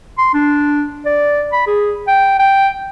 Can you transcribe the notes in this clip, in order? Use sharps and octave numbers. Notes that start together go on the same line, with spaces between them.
C6
D4
D5
B5
G#4
G5
G5